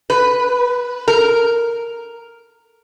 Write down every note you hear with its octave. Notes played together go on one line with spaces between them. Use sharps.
B4
A#4